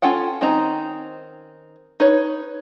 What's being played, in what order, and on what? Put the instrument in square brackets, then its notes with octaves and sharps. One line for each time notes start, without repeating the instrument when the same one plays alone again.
[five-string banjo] C#4 F4 A4 F#5 G5
D#3 C4 C#4 D#4 A#5
D#4 B4 C#5